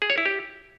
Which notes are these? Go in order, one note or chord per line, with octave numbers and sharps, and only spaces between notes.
G#4
C#5
E4
G4